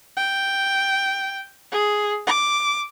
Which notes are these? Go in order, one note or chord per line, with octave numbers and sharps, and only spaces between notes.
G5
G#4
D6